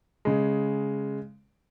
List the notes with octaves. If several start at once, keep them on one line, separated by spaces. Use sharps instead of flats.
C#3 G#3